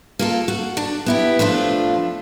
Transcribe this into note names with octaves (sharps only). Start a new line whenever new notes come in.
A#3 F4 A4
F#4
D4
B3 E4 G4
F3 A3 D4 F4